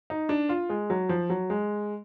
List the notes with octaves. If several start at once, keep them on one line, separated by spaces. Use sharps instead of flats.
D#4
D4
F4
G#3
F#3
F3
F#3
G#3